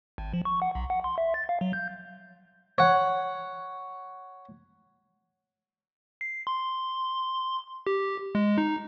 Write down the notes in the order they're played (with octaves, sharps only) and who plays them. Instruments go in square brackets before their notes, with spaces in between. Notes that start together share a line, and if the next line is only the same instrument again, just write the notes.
[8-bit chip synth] G#1
F3
C#6
F#5
B1
F#5
C6
E5
A6
F5
F#3
G6
[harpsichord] C#5 F#5
[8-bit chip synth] C7
C6
G4
G#3
D#4